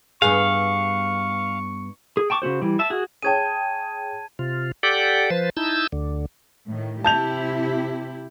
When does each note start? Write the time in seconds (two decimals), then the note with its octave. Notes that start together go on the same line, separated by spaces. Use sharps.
0.22 G2 B3 G#4 F5 C#6
2.17 G#4
2.30 G5 A5 C#6 D6
2.42 C#3 C#4 F#4 C5
2.62 E3 G3
2.79 E5 A5
2.90 F#4 G#4
3.22 G#4 C#5 G5 A5 G#6 D#7
4.39 C3 F4
4.83 G4 A4 D5 F#5 G5
5.30 F3 B4 C5 A6
5.57 D#4 E4 A5 E6 G6
5.92 D2 D3
6.68 A2 D#3
7.04 C3 E4 G4 A5 G6 F7